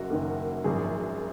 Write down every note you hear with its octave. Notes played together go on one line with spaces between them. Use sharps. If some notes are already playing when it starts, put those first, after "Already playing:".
Already playing: F#1 F#2 A#3 F#4
F#1 F#2 D#3 A#3
G#1 F#2 F3 G#4